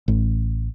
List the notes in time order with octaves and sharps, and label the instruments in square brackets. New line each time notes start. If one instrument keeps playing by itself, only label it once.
[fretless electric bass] A1